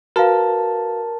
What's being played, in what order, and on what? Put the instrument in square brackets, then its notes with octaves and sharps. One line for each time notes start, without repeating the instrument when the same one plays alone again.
[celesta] F#4 B4 F5 [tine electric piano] A#4 A5